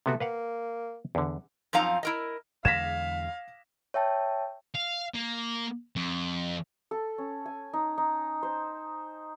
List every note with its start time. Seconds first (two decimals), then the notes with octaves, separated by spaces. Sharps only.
0.06 C3 A3 B3 F#4
0.20 A#3 B4 F5 F#5
1.15 E2 D3
1.73 F#2 F3 C4 D#4 F5 A#5
2.03 E4 A#4 D#5
2.65 E2 D3 G#3 F5 G#6 A#6 B6 E7
3.94 C#5 E5 G5 A5
4.75 F5
5.14 A#3
5.96 F2
6.91 A4
7.18 C#4
7.46 G#5
7.73 D#4
7.98 D#4
8.43 C5